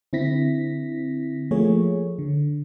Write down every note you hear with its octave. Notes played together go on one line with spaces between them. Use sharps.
D3 C4 E4 A#6 B6
F3 A3 A#3 G#4 C#5
D3